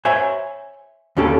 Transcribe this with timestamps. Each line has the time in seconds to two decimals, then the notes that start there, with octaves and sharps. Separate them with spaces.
0.05 C5 C#5 E5 G#5
1.17 D#2 D3 C#4 G4 A4